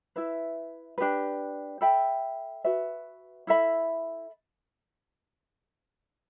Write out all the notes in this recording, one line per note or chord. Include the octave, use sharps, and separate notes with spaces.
E4 B4 E5
D4 G4 B4
A4 E5 G5 B5
F#4 B4 E5
E4 A4 E5 B5